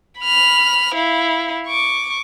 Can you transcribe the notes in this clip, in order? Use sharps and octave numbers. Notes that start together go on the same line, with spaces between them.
B5 F6
E4 F5
C#6 D6